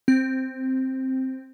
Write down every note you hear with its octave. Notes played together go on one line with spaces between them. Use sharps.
C4